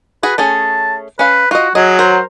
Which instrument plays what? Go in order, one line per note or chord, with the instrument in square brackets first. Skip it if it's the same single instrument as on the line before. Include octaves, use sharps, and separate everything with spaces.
[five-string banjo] F#4 G#4 [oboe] B4
[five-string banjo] A3 C#4 G#4 [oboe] A5
[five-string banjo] C#4 F5 [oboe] B4
[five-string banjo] F4 D#5 [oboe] F#4
[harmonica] F#3 [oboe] G#4 [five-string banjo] D#5
[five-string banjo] A#4 [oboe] C5